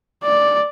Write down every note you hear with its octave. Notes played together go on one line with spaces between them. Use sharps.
D5